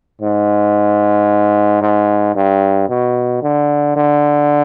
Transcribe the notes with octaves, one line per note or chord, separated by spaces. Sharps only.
G#2
G#2
G2
B2
D3
D3